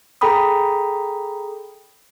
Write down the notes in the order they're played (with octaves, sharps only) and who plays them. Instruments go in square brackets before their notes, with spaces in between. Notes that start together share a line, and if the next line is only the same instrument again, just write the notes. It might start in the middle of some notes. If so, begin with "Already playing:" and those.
[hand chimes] G#4 A4 G5 A#5 B5 D#6